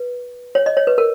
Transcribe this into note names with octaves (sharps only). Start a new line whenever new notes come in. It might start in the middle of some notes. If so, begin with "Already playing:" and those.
Already playing: B4
C#5
D#5
C#5
B4
A#4